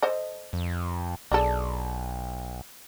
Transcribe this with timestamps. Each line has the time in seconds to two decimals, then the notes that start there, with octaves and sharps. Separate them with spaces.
0.02 A4 C5 D#5
0.53 F2
1.32 B1 D4 G#4 A4